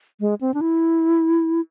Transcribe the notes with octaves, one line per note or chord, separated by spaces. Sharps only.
G#3
C4
D4
E4